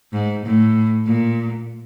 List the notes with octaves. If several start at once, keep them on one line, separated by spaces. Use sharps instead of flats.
G#2
A2
A#2